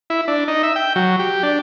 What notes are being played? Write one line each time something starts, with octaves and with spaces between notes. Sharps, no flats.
E4
D4
D#4
E5
G5
F#3
G4
D4